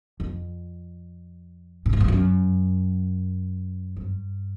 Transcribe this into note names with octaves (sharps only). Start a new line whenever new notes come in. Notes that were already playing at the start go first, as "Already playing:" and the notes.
F2
A2
G#2
G2
F#2
G2